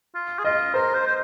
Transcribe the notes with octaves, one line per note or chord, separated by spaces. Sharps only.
F4
G#4
F4 D#5
A#4 C5
C5
C5